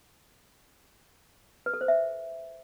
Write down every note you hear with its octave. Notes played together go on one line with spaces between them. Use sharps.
B4
A4
C5
E5